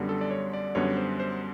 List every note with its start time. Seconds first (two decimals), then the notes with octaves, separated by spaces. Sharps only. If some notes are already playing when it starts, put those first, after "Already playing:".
Already playing: F#2 D3 G3 B3
0.09 A4
0.21 D5
0.31 C#5
0.53 D5
0.75 F#2 D3 G3 B3 C#5
0.97 C5
1.20 C5